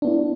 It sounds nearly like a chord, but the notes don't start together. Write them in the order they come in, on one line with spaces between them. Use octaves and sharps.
D4 B3 E4